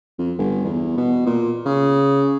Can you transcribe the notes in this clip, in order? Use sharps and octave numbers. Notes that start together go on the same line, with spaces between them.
F2
G1
E2
B2
A#2
C#3